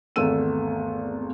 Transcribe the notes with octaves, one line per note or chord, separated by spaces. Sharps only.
G#1 E2 A3 B3 E6 D#7